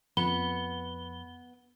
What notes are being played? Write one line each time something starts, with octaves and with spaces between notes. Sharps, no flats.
F2 B3 B5 G7